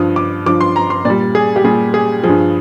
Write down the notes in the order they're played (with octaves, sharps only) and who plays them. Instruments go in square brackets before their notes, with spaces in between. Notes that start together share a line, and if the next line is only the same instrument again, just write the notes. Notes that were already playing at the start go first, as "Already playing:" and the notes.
Already playing: [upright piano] G2 F3 D#6
D6
G2 F3 D6
C6
A#5
C6
A#2 G3 D5
G#4
G4
A#2 G3 G#4
G#4
G2 F3 G#4